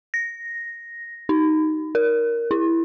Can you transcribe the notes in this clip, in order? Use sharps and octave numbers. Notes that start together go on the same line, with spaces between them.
A#6
D#4
A#4
E4